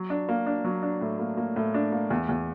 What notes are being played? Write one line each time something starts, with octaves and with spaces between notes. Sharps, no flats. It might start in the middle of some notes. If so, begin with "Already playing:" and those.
Already playing: F#3
D4
A#3
D4
F#3
D4
A2
A#3
A#3
A2
D4
A#3
E2
E2